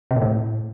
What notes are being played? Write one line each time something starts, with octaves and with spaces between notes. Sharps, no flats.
C3
A#2
A2